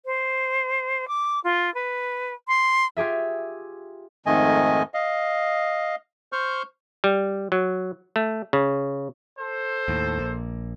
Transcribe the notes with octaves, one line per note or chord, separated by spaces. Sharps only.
C5
D6
F4
B4
C6
F4 G4 G#4 E5
F2 G#2 D#3 A3 D#5 G#5
D#5 F5
C5 C#6 F6 G6
G3
F#3
A3
C#3
A4 C5
D#2 A2
A#1 A#3